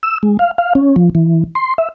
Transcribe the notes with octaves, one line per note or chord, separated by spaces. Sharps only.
E6
G#3
F5
F5
C#4
F3
E3
C6
E5